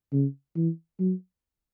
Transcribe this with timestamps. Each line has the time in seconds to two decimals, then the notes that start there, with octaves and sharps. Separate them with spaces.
0.13 C#3
0.56 E3
1.00 F#3